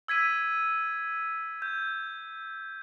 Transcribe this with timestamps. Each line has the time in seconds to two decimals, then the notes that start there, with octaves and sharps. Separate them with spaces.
0.08 E6 G#6 B6 D#7
1.62 G6